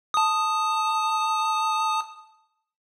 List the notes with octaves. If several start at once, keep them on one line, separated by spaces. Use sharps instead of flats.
A5 D#6